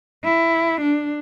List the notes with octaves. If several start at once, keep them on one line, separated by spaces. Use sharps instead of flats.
E4
D4